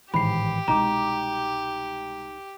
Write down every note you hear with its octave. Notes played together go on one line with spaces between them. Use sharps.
A1 G#2 D#3 E3 G4 B5 C7
C2 B2 G#3 D#4 A#5 D6